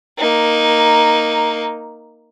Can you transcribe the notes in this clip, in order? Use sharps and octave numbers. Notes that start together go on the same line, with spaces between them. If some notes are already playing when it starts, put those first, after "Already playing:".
A#3 D#4